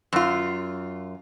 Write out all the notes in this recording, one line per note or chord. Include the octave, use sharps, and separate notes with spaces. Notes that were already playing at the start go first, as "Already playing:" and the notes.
F#2 F4